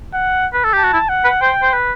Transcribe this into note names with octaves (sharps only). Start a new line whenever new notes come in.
F#5
B4
A4
G4 A5
F#4
E4
F#5
B4
C5 G5
C5
B4